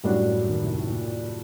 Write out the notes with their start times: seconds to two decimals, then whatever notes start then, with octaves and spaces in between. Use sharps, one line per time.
0.04 F#2 A2 F#3 G3 D4 F#4
0.47 D#2 D#3
0.61 C2 C3
0.76 A#2
0.90 A#2